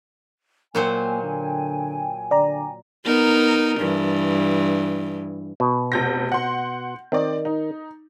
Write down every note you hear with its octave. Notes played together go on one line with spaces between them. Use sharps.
A#2 F#3 A#3 C5 G5 G#5
D3
D3 D5 A#5
B3 D#4 A#4
G2 E3
B2
F1 G6 A#6
F#5 C6
D#3 C4 D5
D#4